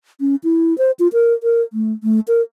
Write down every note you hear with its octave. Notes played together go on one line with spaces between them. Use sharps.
C#4
E4
C5
F4
A#4
A#4
A3
A3
A#4